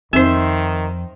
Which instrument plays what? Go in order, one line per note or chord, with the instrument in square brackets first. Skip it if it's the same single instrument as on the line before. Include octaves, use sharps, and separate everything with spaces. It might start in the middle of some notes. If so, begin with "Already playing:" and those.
[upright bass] F2 [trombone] D#3 [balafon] C4 D#4 [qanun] C5 E5